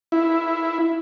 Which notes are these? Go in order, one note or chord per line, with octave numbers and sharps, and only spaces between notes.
E4